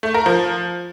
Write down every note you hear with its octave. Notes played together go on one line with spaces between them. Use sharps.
A3
A#4
F3